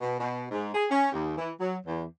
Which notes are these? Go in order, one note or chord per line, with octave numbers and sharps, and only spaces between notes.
B2
B2
G#2
G#4
C#4
D#2
E3
F#3
E2